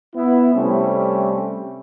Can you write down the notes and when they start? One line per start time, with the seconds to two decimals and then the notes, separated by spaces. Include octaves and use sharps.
0.15 B3 E4
0.55 C3 G3 A3 C4 C#4